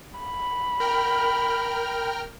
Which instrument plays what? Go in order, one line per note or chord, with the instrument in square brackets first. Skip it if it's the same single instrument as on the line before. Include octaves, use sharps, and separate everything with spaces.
[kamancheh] B5
[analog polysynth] A#4 G5 F6